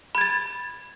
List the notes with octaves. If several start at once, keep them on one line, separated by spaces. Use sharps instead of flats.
B5 G#6 A6